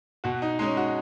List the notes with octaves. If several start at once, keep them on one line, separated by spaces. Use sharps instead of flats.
B2 F#4
D#4
G#3 C#4 D#4
F#4